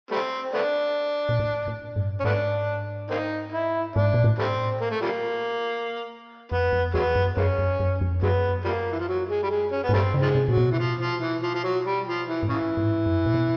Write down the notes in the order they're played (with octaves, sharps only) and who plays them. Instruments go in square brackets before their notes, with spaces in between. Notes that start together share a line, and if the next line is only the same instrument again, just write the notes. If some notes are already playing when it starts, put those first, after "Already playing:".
[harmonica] G3 A3 C4
A3 B3 D4
[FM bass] A#2
A2
A2
G2
[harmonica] C#4
[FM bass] G#2 [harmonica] A3 B3 D4
[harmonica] A#3 C4 D#4
E4
[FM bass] G#2 [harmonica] D4
[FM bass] A#2
A2
[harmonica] G3 A3 C4
A#3
A3
F3 G3 A#3
[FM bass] F2 [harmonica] B3
[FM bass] F2
[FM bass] E2 [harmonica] F#3 G#3 B3
[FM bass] F#2
[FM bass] F#2 [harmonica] G#3 A#3 C#4
[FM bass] F#2
F#2
F2
[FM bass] F#2 [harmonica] F#3 G#3 B3
[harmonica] F3 G3 A#3
E3
F3
F#3
G#3
G3
G#3
C#4
B3
[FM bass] G#2
[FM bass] G2 [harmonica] G3 A3 C4
[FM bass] C#3
[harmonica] D#3 F3 G#3
[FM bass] C3
[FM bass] A#2 [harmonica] F#3
[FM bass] B2
[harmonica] E3
F3
F3
E3
F3
F3
F#3
G3
F3
E3
[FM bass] G#2
[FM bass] A2 [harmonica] C#3 E3
[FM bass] G#2
F#2
A#2
B2